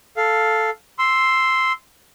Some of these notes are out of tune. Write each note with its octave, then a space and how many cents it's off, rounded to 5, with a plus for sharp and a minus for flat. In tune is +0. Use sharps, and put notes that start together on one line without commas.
A4 +0 F5 +0
C6 +0 E6 +0